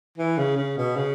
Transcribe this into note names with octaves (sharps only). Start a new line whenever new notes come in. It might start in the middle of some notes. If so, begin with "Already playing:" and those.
E3
C#3
C#3
B2
C#3